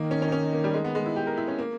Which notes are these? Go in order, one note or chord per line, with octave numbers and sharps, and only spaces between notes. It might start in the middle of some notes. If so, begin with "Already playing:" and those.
Already playing: D#3 A#3
C#4
C#4
D#4
C#4
A#3
G3
G#3
B3
G#3
E4
G4
A#4
E4
C#4
A#3